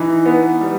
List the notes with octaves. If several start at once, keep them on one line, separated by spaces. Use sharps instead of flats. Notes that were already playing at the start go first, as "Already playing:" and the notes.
Already playing: E3 D#4
B3
G3